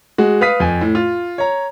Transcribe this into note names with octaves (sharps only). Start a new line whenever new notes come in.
G#3 F#4
B4 F5 D#6 B6
F2 G#5
A2
F4
C#5 A#5